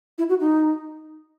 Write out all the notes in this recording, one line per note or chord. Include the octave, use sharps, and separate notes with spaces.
E4
F#4
D#4